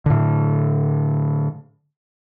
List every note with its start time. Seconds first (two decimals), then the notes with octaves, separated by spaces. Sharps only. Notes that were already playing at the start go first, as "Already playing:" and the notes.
0.06 A2 D3